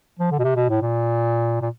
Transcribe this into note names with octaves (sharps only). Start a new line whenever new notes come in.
F3
D3
B2
C3
B2
A2
A#2
A#2